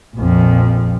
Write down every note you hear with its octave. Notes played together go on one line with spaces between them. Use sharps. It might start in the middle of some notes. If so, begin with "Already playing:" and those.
A#1 F2